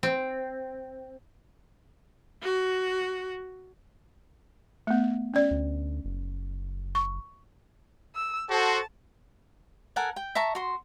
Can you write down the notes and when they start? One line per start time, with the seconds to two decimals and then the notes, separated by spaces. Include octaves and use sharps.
0.03 C4
2.43 F#4
4.87 A3 B3
5.34 C#4 D5
5.51 D2
6.05 F#1
6.95 C#6
8.15 E6
8.50 F#4 A4 C5 A5
9.96 A4 A#4 F#5 G#5
10.16 G5
10.35 E5 A5 A#5 C#6
10.55 F#4 C6